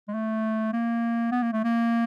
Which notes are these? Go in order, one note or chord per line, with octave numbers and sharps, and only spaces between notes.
G#3
A3
A#3
B3
A#3
A3
A#3